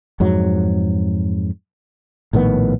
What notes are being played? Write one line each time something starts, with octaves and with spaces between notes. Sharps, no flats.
F2 G#2 F#3
A#1 A2 D#3 B3